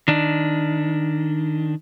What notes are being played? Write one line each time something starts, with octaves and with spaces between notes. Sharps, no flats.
D#3 D4